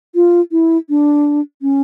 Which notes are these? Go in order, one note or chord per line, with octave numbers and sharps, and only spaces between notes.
F4
E4
D4
C#4